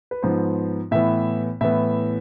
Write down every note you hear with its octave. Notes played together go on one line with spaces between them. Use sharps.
B4
G#2 F3 B3 C5
A2 E3 B3 E5
A2 E3 B3 E5